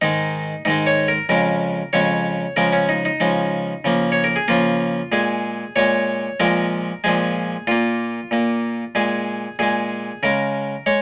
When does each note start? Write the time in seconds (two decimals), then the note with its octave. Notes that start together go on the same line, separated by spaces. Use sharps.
0.02 G#2 D#3 G#3 D#4
0.65 G#2 D#3 G#3 D#4
0.87 C#5
1.08 A#4
1.29 F2 C#3 G#3 A#4
1.93 F2 C#3 G#3 C#5
2.56 C#3 F3 G#3 A#4
2.73 C#4
2.89 D#4
3.05 D#4
3.20 C#3 F3 G#3
3.84 C#3 F3 A#3
4.12 C#5
4.24 A#4
4.36 G#4
4.48 C#3 F3 A#3 F4
5.12 A#2 G#3 G#4
5.76 A#2 G#3 C#5
6.40 A#2 F3 G#3 A#4
7.04 A#2 F3 G#3 G#4
7.67 A#2 A#3 F4
8.31 A#2 A#3
8.95 A#2 G#3 G#4
9.59 A#2 G#3 G#4
10.23 C#3 G#3 A#4
10.86 G#3 C#5